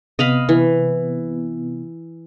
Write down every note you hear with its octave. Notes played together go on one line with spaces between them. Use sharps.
C3 B3 D#5 F5 B5
E3